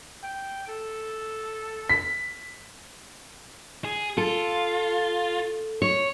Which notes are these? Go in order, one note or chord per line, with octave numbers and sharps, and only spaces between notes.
G5
A4
B6
G#4
F4 A4
C#5